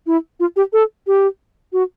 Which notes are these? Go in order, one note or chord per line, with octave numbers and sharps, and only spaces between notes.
E4
F4
G4
A4
G4
F#4